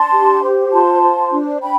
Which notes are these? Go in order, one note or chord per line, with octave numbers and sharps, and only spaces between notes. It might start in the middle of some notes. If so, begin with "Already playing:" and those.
Already playing: D4 A5 C6
G4
C5
F4 A5 C6
C5
D4
D4 G5 B5